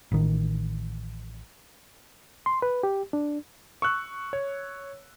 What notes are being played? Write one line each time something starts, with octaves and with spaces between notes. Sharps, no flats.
A1 D#3
C6
B4
G4
D4
C#6 E6 F#6
C#5